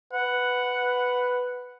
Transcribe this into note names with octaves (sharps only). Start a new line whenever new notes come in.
B4 F#5